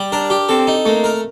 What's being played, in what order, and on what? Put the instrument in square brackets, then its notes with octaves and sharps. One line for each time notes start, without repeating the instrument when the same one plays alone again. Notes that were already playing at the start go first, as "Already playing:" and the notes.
Already playing: [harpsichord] G3
[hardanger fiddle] D4 [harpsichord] A#4
[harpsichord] G4
[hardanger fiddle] C4 [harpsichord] A4
[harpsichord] D#4
[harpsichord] A3 [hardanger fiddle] A#3
[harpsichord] A#4